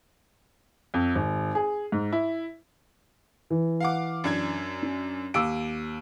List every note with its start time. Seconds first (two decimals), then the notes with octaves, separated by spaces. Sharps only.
0.94 F2
1.15 G#1
1.55 G#4
1.92 G#2
2.12 E4
3.50 E3
3.80 F5 F#5 D6
4.24 F#2 D4 G#6
4.82 C#4
5.34 D#2 D6 E6 D7